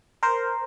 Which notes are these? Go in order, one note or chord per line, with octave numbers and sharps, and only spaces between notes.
A#4 C5